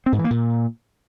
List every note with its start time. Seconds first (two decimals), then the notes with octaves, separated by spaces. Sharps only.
0.06 C4
0.12 G#2
0.18 E3
0.24 A#3
0.30 A#2